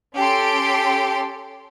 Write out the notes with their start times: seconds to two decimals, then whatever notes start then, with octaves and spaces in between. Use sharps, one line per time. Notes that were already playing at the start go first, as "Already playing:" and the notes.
0.17 C#4 G4 A4 C6 D7